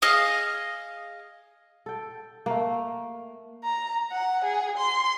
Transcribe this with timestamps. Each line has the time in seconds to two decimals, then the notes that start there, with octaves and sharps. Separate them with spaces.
0.02 G#4 D#5 F5 D#6
1.86 A4 G5
2.46 A3 A#3
3.64 A#5
4.11 F#5
4.44 G#4
4.78 C6